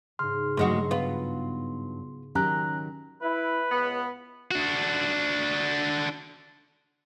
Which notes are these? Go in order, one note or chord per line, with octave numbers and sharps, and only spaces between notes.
G#2 C#3 C6 F6
D2 G2 F#3 G#3 D#4 F#4 C6
B3 F4
D#3 F#3 C#4 G4 A#5 F#6
E4 B4
C#2 B3
D4 F#4